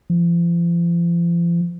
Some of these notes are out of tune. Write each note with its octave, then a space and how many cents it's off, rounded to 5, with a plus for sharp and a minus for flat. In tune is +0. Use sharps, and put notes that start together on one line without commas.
F3 -40